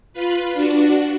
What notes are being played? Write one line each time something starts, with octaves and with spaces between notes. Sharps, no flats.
F4 B4
D4 F#4